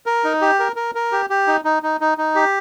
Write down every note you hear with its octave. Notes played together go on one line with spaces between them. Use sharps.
A#4
D#4
G4
A#4
A#4
A#4
G4
G4
D#4
D#4
D#4
D#4
D#4
G4